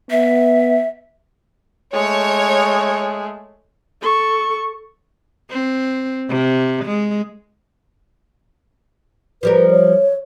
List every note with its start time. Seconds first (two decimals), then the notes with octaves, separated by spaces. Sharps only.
0.11 B3 E5
1.93 G#3 A3 C#5
4.02 A4 C#6
5.50 C4
6.29 C3
6.85 G#3
9.43 F3 G3 A#4 B4
9.71 C#5